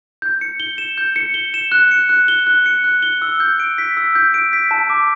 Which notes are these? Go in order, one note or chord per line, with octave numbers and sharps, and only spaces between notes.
G6
C#7
G7
E7
G6
C#7
G7
E7
F#6
C#7
F#6
G7
F#6
C#7
F#6
G7
E6
G6
D7
B6
E6
G6
D7
B6
A5
D6